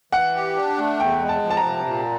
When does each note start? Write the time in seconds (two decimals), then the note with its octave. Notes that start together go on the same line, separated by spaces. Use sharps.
0.12 E3 F#5
0.34 G4
0.56 D4
0.78 A3
0.99 E2 G5
1.21 G#3
1.29 A5
1.43 F3
1.50 A5
1.57 A#5
1.64 C3
1.86 A#2